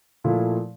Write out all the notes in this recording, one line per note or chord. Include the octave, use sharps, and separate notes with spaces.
A#2 F3 A3 E4